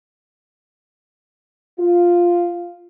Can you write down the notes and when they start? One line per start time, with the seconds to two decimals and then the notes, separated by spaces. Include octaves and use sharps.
1.79 F4